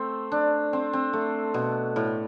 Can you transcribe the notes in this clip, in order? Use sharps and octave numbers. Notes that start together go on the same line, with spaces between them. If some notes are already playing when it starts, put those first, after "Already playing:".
Already playing: A3 C4
D4
C4
C4
A3
B2
A2